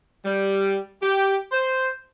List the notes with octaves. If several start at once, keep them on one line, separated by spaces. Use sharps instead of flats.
G3
G4
C5